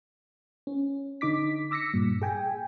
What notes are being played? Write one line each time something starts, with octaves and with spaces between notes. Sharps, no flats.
C#4
D3 D#4 D6 B6
D6 E6 A#6 B6 C#7
G2 A#2
G#4 G5 G#5